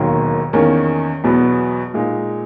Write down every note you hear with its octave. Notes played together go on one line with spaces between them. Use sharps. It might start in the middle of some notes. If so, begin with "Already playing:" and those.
Already playing: E1 D#2 D#3 F#3 A#3
E2 D#3 A#3 C#4
E2 B2 F#3 B3
A#2 G#3 D#4